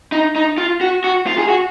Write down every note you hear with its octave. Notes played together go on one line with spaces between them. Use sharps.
D#4
D#4
F4
F#4
F#4
F4
G#4
F#4